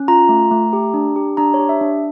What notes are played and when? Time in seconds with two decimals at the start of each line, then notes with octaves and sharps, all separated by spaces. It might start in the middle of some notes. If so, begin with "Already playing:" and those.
Already playing: C#4
0.08 F4 A#5
0.29 A3
0.51 A3
0.73 G4
0.94 D4
1.16 G4
1.37 D4 A#5
1.54 C#5
1.59 G4
1.69 E5
1.81 D4